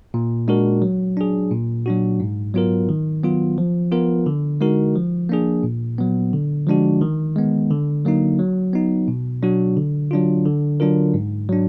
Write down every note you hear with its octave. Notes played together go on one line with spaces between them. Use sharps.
A#2
G#3 D4 F#4 A#4
F#3
D4 G#4
A#2
F#3 D4 F#4
G#2
F#3 B3 F4 A#4
D#3
F#3 B3 F4
F3
B3 F4 A#4
D3
G#3 D#4 F#4 A#4
F3
A#3 D4 G#4
A#2
F#3 B3
D3
F3 G#3 D4 F#4
D#3
G#3 B3
D3
F#3 A#3 D#4
F#3
B3 D#4
B2
F#3 D4 F#4
D3
F#3 D4 F4
D3
F#3 D4 F4 A#4
G#2
F#3 D4